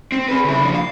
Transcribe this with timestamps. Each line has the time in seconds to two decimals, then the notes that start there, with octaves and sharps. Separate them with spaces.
0.12 C4
0.29 G#4 B4
0.44 C#3 E4
0.60 F3 D4
0.74 F5